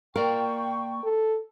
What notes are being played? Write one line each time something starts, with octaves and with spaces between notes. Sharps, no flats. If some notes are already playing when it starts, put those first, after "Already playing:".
A#3 A#4 D5 F5 G5 C#6
A4